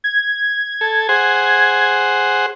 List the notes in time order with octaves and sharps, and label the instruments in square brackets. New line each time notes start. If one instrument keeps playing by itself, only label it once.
[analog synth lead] G#6
[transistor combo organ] A4
G#4 C5 F#5